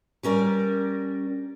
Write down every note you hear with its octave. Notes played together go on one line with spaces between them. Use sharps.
G3 C#4 A#4 D5